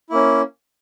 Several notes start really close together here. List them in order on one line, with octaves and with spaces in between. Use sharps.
E4 A#3 C#4